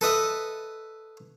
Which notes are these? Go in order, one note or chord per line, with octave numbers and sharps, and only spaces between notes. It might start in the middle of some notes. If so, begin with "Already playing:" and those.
A4 B4 D#5 E5